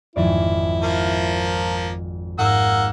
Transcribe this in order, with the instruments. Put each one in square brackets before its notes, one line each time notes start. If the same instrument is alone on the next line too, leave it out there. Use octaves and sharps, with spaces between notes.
[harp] G#1 F2 D5 [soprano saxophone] E4
[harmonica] F3 A#3
[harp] G#2 [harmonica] A#3 E6 [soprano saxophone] F#5